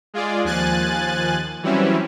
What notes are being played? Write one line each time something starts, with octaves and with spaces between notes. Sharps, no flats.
G#3 F4 G#4 D5
D#2 F3 G#5 F#6 A6
E3 F#3 G3 C4 C#4 E4